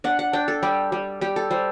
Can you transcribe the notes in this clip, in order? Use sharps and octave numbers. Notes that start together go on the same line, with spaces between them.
D4 F#5
F#5
D4 G5
A4
G3 G4
G3
G3 G4
A4
G3 C5